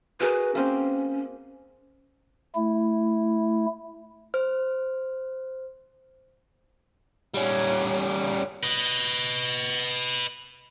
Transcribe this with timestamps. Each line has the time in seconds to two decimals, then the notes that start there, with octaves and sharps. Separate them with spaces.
0.20 F#4 G#4 A#4 B4
0.55 A#3 C4 C#4
2.55 A3 E4
4.34 C5 F6
7.35 G3 C#4
8.63 B4 D#5